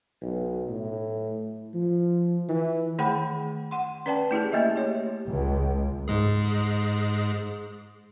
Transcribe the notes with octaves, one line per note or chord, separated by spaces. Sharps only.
B1
A2
F3
E3
D#3 A3 G#4 F#5 G5 B5
F#5 C6
C#4 B4 D5 G5 A5
A3 E4 G4 G#4
A3 A#3 G4 D#5 E5
G4 C#5
C#2
G#2 G#3 G#4